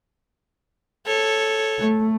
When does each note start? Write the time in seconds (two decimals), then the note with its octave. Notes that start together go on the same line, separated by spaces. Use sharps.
1.06 A4 C#5
1.79 A3